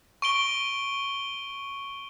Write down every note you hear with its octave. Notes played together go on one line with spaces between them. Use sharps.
C#6 D7 G7